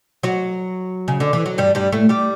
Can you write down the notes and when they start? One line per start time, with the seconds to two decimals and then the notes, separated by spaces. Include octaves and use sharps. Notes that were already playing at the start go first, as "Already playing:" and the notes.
0.23 F#3 F#4
1.08 C#3
1.20 D3
1.33 E3
1.46 F#3
1.58 G2 G3
1.75 G2 G3
1.92 A2 A3
2.09 G3 G4